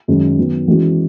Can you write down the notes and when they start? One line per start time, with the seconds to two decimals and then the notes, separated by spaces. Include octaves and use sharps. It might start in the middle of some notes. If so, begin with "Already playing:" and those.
0.08 F#2 D#3 G#3
0.38 D#3 F#3 B3
0.68 E3 G#3 C#4 F#4